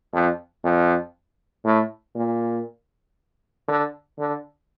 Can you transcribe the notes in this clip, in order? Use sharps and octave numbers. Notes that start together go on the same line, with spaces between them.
F2
F2
A2
A#2
D3
D3